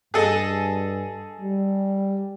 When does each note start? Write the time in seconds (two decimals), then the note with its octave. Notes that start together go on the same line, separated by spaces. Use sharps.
0.14 G2 G#4 A4 D#5
1.41 G3